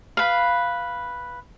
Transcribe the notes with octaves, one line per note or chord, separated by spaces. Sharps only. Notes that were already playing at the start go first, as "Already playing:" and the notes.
B4 F5